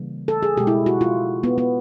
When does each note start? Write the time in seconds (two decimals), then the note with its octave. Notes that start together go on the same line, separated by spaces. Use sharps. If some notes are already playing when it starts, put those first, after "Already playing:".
Already playing: C#3 E3 G3 A#3
0.28 A4
0.43 G#4
0.57 B2 G#3 G4
0.67 E4
0.86 F#4
1.01 F4
1.44 B3
1.58 B3